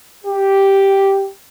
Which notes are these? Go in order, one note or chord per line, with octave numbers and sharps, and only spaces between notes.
G4